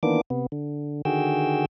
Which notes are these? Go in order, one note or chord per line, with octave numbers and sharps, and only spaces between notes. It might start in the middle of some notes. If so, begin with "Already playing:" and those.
D#3 E3 A#3 B3 D4 D6
C3 B3
D3
D3 D#3 F#4 G#4 G5 E6